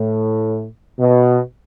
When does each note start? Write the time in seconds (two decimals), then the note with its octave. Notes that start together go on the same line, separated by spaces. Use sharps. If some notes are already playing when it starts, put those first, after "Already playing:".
Already playing: A2
1.00 B2